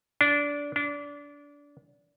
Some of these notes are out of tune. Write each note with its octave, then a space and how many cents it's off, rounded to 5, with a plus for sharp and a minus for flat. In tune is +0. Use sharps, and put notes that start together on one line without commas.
D4 -20
D4 -25